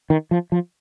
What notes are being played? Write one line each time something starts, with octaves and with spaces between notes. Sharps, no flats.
D#3
F3
F3